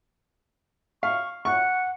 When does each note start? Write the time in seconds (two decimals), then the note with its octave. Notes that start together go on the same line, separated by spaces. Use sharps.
1.03 F5 C#6
1.45 F#5 C#6